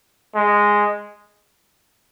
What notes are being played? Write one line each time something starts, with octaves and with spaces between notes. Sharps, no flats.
G#3